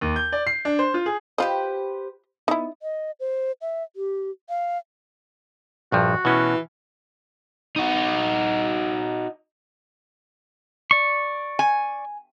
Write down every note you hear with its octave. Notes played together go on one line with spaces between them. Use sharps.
D#2
G6
D5
C7
D4
C5
F4
G#4
F4 G4 B4 C5 D#5
B3 D#4 E4
D#5
C5
E5
G4
F5
A#1 G2 F3 F#4
B2 E3 C#4
D#4 F#4
D5 C#6
G#5